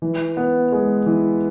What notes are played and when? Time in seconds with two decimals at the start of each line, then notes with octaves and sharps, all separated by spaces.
0.02 E3
0.37 B3
0.72 G#3
1.06 E3